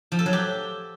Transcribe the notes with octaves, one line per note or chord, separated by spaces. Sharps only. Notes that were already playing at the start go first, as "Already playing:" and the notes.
F3
A4
F#3
G4